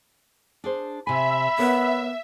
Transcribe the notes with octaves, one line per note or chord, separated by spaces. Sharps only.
D4 G#4 C5
C3 E5 G#5 B5
B3 A#4 C#5 F#5